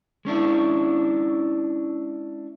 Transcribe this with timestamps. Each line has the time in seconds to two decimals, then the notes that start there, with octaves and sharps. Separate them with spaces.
0.25 G#3 C#4 D4 E4